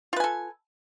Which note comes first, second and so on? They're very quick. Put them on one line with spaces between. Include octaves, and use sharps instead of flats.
F4 B4 G#5 A4